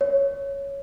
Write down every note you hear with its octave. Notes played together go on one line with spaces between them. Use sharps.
C#5